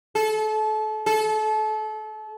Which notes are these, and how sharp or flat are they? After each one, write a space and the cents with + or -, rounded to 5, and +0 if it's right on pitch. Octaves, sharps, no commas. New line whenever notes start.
A4 -30
A4 -30